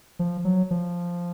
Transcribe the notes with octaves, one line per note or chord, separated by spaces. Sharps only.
F3
F#3
F3